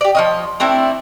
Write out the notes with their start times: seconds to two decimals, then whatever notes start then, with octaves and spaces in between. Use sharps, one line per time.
0.01 G4 D5
0.15 F3 C#5 D#5
0.60 A3 C4 D4 E4